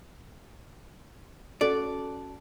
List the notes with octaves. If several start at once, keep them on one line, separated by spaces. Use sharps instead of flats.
C#4 F#4 A4 D5